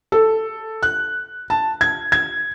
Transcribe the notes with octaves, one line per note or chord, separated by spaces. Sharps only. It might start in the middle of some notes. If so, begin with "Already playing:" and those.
A4
F#6
A5
G#6
G#6